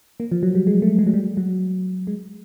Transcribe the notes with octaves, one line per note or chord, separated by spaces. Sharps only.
A#3
F3
F#3
G3
G#3
A3
G#3
F#3
G3
F#3
G#3